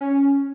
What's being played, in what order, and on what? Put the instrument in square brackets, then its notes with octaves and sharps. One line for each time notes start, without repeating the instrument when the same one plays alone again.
[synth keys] C#4